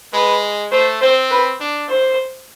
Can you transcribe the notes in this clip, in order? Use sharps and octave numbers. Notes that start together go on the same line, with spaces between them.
G#3 B4
A3 C5
C4 C5
B4
D4
C5